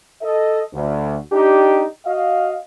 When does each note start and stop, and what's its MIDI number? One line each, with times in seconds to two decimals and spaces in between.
0.22 0.61 69
0.22 0.61 75
0.74 1.16 38
1.32 1.84 62
1.32 1.84 63
1.32 1.84 67
2.05 2.55 66
2.05 2.55 75
2.05 2.55 77